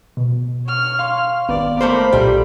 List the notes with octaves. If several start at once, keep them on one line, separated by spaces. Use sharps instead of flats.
B2
C#5 F6
F5 C6
G#1 B3 D5
A3 A#3 C5 B5
B1 A#2 G3 A4